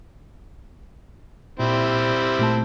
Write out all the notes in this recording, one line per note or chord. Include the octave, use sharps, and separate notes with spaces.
A#2 G3 C4 E4
A#2 A3 A5